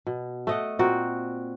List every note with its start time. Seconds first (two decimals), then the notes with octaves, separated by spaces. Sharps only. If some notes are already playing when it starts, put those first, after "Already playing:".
0.07 B2
0.47 A3 D#5 F#5
0.79 A#2 C4 F#4 A#4